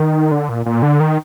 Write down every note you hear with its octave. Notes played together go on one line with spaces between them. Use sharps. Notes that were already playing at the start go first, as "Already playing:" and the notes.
Already playing: D#3
D3
A#2
A#2
D3
D#3